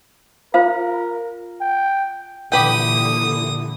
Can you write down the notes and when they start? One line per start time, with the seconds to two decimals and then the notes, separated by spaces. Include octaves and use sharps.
0.54 F4 A#4 C5 F5
1.61 G5
2.52 A#2 D3 E3 G4 B4 G5 D#6